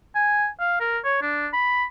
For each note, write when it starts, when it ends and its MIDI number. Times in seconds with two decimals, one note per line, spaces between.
0.15 0.47 80
0.60 0.79 77
0.80 0.99 70
1.04 1.18 73
1.22 1.48 62
1.53 1.84 83